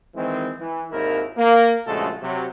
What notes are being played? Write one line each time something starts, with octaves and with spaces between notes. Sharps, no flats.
D#3 E3 G#3 C4
E3
G#1 D#2 D#3 E4 A#4
A#3
A#1 C#3 G#3 A3 F#4 A4
C3 F#3 G4